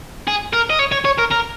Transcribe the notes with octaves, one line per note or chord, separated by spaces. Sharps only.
G#4
A#4
D#5
C#5
C#5
C#5
A#4
A#4